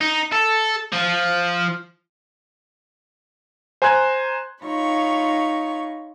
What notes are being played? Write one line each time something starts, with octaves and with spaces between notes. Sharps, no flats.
D#4
A4
F3
C5 G#5 A#5 C6 F#6 G#6
D#4 F4 C#5 B5 C#6